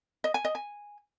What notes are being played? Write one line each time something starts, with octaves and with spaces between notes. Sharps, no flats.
D#5
G#5
D#5
G#5